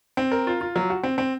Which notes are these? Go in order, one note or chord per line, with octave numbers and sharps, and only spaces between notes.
C4
A#4
F4
F4
F#3
F#4
C4
C4